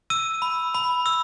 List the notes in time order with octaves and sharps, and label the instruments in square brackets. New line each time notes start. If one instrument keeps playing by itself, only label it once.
[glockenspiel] E6 D#7
B5
B5
E6